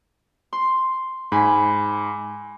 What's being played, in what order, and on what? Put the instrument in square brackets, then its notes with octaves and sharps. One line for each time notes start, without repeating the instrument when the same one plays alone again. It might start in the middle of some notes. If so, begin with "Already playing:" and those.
[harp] C6
[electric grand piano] G#2 [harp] G#5 B5